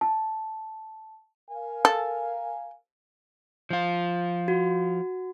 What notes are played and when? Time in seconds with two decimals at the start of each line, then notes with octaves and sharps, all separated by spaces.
0.01 A5
1.51 A#4 F5 G#5
1.85 A4
3.70 F3 F4
4.48 F#4